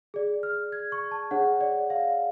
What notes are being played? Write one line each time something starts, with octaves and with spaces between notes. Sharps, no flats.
G#4 D5
F6
G#6
C#6
A5
D4 G#4 C#5 F#5
D5
F5